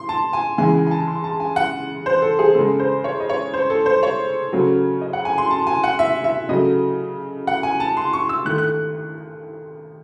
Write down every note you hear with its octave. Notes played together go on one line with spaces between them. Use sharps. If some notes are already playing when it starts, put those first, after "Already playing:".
Already playing: C6
A5
G#5
C#3 E3 G#3 G#5
G#5
G#5
A5
C6
A5
G#5
F#5
C5
A4
G#4
C#3 G#3 A4
C5
C#5
D#5
C#5
C5
A4
C5
C#5
C#3 F#3 A3
D#5
F#5
G#5
C6
A5
G#5
F#5
E5
E5
C#3 F#3 A3 D#5
F#5
G#5
A5
C6
C#6
E6
D#3 A3 F#6
F#6